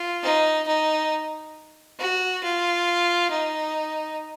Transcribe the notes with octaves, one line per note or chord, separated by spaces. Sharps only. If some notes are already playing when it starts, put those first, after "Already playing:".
Already playing: F4
D#4
D#4
F#4
F4
D#4